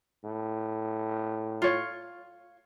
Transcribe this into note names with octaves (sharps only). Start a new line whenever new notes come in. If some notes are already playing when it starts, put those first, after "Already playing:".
A2
F4 C#5